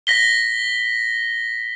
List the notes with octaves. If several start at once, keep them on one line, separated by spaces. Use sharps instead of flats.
A#6 B6 G7